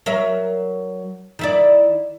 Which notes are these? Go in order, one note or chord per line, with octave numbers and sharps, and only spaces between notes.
F#3 A#4 E5
D#3 E4 D5